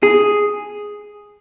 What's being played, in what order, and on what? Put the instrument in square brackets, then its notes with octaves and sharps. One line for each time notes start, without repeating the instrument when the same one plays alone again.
[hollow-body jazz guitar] G#4